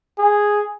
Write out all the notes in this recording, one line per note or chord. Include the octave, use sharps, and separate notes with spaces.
G#4